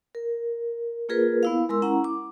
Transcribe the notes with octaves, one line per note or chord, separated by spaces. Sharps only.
A#4
A#3 F4 G#4 A#4 B4
B3 E4 F5
G#3 A#4 C6 E6
C#4 E4 F#5 A#5
D6